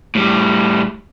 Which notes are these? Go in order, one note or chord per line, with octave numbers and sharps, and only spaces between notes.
A2 G3